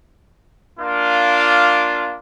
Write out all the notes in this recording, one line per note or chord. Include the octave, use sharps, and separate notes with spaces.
A#3 D4 F4